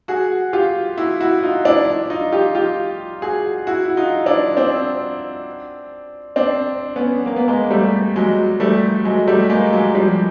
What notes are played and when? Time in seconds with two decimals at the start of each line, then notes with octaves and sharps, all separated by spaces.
0.08 F#4 G#4
0.53 F4 G4
0.98 E4 F#4
1.20 E4 F#4
1.43 D#4 F4
1.65 D4 E4
2.10 D#4 F4
2.32 F4 G4
2.55 F4 G4
3.22 F#4 G#4
3.67 E4 F#4
3.85 E4
3.97 D#4 F4
4.26 D4 E4
4.57 C4 D4
6.36 C4 D4
6.96 B3 C#4
7.26 A#3
7.36 B3
7.48 G#3 A#3
7.70 G3 A3
8.16 F#3 G#3
8.60 G3 A3
9.05 F#3 G#3
9.27 G3 A3
9.50 G#3 A#3
9.72 F#3 G#3
9.94 F3 G3